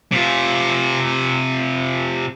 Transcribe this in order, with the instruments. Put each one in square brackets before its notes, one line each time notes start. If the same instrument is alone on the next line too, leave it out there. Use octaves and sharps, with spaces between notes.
[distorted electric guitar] C3 F4